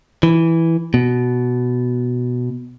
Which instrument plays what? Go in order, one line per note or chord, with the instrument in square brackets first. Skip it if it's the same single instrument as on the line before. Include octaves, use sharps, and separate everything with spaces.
[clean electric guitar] E3
B2